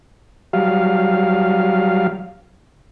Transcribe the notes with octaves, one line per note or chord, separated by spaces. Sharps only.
F#3 G3 F5